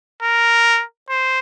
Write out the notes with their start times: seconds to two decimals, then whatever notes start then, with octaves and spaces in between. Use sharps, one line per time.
0.23 A#4
1.09 C5